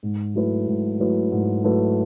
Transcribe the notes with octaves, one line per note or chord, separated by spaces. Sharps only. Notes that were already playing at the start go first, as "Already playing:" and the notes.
G#2
F#3 A3 E4 B4
G#2
F#3 A3 E4 B4
G#2
F#3 A3 E4 B4